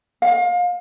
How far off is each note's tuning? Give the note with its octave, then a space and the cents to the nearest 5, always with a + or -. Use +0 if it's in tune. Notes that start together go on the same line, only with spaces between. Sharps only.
F5 +30